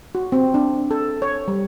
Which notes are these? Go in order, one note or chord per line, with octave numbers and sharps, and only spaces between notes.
F#4
C4
D4
A4
C#5
G3